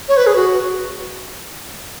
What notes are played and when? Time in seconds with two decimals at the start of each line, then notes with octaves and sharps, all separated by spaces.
0.09 C#5
0.17 B4
0.27 G#4
0.36 F#4